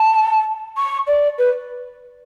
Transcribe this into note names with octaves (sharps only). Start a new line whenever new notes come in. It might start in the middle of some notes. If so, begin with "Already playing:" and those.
Already playing: A5
C#6
D5
B4